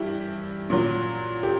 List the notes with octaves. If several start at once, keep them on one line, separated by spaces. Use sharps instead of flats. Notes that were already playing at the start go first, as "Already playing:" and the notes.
Already playing: G2 E3 E4 G4
A#2 F#3
G4